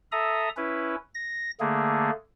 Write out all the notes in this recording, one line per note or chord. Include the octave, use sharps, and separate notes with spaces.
A4 E5 A#5 D#6
C#4 E4 B4
A#6
D3 A3 A#3 G#4